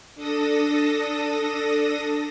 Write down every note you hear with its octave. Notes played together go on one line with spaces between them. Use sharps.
D4 A4 D#6 A#6